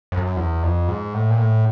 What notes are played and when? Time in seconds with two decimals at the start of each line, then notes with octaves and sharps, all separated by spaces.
0.12 F#2
0.37 E2
0.63 F2
0.88 G#2
1.14 A2
1.30 A#2
1.38 A2